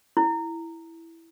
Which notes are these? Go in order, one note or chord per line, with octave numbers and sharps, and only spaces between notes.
E4